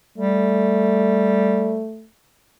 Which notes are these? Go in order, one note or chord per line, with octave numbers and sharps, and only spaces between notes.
G3 A3